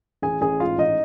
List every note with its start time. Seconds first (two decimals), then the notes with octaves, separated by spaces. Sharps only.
0.22 A1 G#4 G#5
0.41 A1 G#4 G#5
0.60 G#2 F4 F5
0.78 A1 D#4 D#5